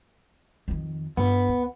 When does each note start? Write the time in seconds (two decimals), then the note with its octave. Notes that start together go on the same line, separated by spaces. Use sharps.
0.68 F2 D#3
1.17 G2 B3 F4
1.48 D2